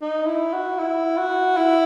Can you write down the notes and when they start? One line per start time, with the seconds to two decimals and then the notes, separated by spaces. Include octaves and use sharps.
0.01 D#4
0.26 E4
0.53 F#4
0.79 E4
1.18 F#4
1.57 E4